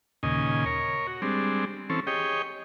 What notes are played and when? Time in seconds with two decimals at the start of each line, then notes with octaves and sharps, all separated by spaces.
0.23 D#2 A#2 C#3 D#5 G#5
0.66 A#4 C#5
1.07 F#4
1.22 G3 G#3 C4 D4
1.90 E3 C4 C#4 A4
2.07 G4 G#4 C#5 D#5 G5